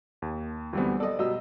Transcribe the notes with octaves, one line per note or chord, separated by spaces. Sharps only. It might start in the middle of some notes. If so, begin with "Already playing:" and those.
D#2
D2 E3 G3 B3 C4
A4 D5 D#5
B2 F#3 G3 D#5 E6